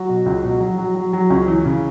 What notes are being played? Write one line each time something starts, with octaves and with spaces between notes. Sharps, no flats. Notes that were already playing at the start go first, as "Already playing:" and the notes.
Already playing: F#3 F#4
B2
C#2
B2
F#3
F#3
F#3
F#3
C#2 C#4
E3
C#3